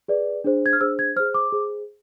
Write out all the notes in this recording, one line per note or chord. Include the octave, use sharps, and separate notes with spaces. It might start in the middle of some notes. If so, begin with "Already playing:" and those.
G#4 B4 D5
D4 G#4 C5
G#6
F6
D4 G#4 C5 E6
G#6
G#4 C5 F6
D6
G#4 C5